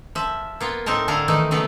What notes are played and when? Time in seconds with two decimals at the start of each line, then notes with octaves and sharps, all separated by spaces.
0.15 F3 E5
0.60 A#3 B3 F4
0.86 A2 C4 D#4 A#4 A5
1.08 D3 D4 E4 F4 F5 A#5
1.28 D#3 E3 A3 D#4
1.51 C#3 E3 F#3 A3 B3